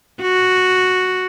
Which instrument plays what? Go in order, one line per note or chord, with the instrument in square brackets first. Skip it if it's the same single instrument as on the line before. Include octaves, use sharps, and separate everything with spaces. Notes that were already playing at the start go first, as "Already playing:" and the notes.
[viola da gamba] F#4